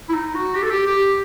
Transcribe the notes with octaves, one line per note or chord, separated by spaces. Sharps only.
E4
D#4
F#4
G4
A4
G4
G4